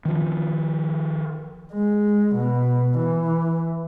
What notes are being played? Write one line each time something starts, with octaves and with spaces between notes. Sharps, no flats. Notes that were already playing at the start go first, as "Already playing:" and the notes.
D#3 F3
G#3
B2
E3